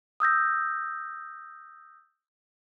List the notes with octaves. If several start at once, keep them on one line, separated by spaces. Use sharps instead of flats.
D#6 E6 G6 A#6